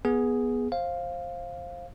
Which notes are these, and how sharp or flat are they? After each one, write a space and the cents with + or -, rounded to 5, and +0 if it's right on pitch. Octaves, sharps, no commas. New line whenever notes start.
B3 -10 G#4 +0
C5 +20 F5 +0